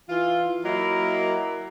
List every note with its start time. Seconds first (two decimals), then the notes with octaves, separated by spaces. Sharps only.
0.09 E3 F4
0.65 F#3 A#3 E4 A#4 D#5